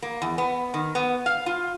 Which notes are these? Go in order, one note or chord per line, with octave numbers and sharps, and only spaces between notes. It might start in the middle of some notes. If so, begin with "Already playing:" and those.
A#3
E2
B3
D#3
B3
F5
F4